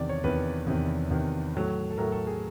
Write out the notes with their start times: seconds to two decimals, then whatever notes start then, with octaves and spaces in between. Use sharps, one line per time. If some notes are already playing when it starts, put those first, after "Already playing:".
Already playing: E2 C3 D#3 D5
0.09 C#5
0.24 E2 C3 D#3 B4
0.67 E2 C3 D#3
1.11 E2 C3 D#3
1.54 A2 F#3 A3
1.91 A4
1.98 A2 F#3 A3 A#4
2.12 A4
2.27 G#4